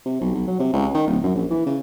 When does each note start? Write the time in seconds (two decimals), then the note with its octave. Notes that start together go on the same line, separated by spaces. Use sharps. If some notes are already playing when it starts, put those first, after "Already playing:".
0.06 C3
0.21 B1
0.35 B1
0.47 F#3
0.59 C3
0.73 C#2
0.94 D#3
1.07 D1
1.24 F#2
1.35 A#1
1.51 E3
1.66 C#3